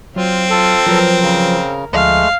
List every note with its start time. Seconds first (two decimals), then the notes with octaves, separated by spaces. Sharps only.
0.16 F#3 C4 F4
0.50 F4 A4
0.87 F3 F#3 A#4 B4
1.22 C#3 A#4
1.93 D2 F3 G#3 A3 F5